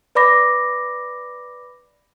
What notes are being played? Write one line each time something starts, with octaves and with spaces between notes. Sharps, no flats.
B4 D5 B5 D6 A#6